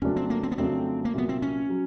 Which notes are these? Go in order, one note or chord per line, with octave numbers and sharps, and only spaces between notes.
F2 C#3 F#3 A3 C#4 D4
C4
A#3
C4
B3
F2 C#3 F#3 A3 C4 D4
A#3
C2 A#2 F#3 B3
C4
C#4
F#3